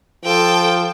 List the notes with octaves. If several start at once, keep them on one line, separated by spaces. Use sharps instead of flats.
F3 A4 G5